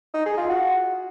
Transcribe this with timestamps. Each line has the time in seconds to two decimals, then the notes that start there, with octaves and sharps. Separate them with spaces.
0.14 D#4
0.26 G#4
0.38 F4
0.49 F#4